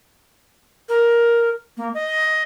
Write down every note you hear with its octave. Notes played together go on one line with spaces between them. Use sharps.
A#4
A#3
D#5